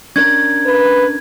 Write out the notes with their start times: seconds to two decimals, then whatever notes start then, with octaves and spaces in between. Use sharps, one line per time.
0.16 C#4 D4 A#4 G#6
0.66 B4